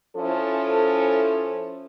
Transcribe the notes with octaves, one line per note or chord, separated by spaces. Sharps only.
F3 C#4 E4 A4